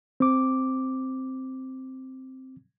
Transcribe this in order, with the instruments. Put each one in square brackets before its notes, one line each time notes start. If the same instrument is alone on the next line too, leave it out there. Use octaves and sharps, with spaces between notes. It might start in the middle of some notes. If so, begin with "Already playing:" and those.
[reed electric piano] C4 D6